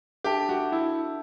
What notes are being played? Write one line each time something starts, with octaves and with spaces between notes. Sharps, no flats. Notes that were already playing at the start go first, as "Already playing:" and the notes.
D4 G4 A4 E5 A5
F#4
E4